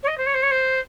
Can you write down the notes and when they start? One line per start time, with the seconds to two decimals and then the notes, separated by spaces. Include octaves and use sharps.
0.03 C#5
0.07 D#5
0.17 C5
0.26 C#5
0.34 C5
0.42 C#5
0.51 C5